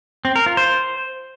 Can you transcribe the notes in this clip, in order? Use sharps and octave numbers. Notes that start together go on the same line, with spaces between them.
C4
A#4
F4
C5